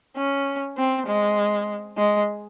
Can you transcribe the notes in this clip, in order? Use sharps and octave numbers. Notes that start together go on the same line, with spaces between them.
C#4
C4
G#3
G#3